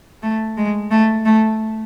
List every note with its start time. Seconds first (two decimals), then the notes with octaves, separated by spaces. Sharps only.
0.23 A3
0.57 G#3
0.91 A3
1.25 A3